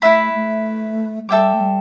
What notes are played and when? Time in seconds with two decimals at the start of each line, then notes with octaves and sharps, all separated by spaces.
0.02 A3 E4 B4 E5 B5
0.33 A3
1.29 G3 A4 E5 G5 D6
1.54 A3
1.60 G3